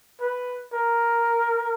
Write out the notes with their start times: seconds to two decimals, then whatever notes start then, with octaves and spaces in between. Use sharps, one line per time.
0.21 B4
0.73 A#4